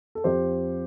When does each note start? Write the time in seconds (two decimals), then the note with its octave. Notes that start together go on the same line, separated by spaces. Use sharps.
0.15 A4
0.24 F2 F3 G4 C5